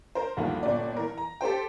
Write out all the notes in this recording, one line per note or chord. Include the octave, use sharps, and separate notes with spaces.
A#4 C5
D2 G2 D#3 F3 A#3
G1 A#2 C#4 D5
E3 A#4
A#5
G4 A4 C5 G5